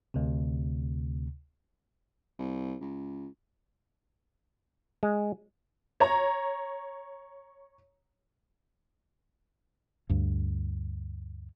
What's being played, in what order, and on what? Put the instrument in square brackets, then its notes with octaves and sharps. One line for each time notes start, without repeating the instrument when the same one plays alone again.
[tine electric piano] D2 C3
[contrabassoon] C2
C#2
[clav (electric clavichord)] G#3
[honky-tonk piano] C#5 A#5
[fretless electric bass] D2 G2